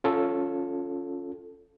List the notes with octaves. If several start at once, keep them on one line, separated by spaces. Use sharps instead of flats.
C#4 F4 A4